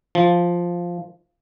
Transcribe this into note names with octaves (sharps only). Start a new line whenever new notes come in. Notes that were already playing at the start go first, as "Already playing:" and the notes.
F3